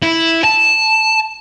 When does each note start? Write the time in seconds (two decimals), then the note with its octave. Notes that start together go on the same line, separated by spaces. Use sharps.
0.02 E4
0.44 A5